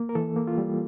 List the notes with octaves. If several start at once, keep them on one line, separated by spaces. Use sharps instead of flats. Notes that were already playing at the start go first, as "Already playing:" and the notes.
Already playing: A#3
A#4
E3 A4
A#3
F4
G3